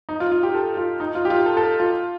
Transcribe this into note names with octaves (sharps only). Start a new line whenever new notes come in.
D#4
F4
F4
G4
A4
F4
D#4
F4
G4
F4
A4
A4
F4